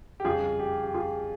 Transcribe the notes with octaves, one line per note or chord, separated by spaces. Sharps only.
G4
F2 C#3 G3 F4 G#4
G4
G4
F4 G#4